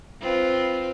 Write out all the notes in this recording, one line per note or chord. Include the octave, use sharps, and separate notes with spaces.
C4 F4 B4